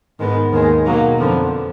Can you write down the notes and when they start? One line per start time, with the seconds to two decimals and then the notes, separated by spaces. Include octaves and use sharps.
0.18 G#2 D#3 G#3 B3
0.52 D#2 D#3 G#3
0.85 B2 F#3 A#3 D#4
1.18 F2 D3 F3 B3